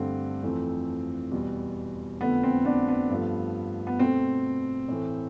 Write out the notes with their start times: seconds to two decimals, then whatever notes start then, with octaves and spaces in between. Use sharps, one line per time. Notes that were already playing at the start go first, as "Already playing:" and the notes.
Already playing: G2 D3 A3 C4
0.42 F2 E3 A3
1.31 E2 B2 G3
2.21 F2 D3 A3 B3
2.43 C4
2.65 B3 D4
2.88 B3
3.10 G2 F3 A3
3.87 B3
3.99 B2 A3 C4
4.88 A2 E3 A3